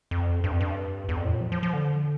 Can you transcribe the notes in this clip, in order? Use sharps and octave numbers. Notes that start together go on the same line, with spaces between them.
F2
G2
F2
G2
E2
F2
A2
A#2
F3
F3
F3
D3